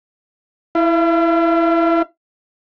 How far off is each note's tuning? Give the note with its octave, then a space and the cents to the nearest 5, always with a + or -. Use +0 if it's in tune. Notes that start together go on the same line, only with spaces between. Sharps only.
E4 +0 F5 -45